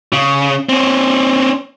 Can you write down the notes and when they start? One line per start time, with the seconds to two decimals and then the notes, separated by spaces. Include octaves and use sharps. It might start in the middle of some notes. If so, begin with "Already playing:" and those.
0.13 C#3
0.69 C4 C#4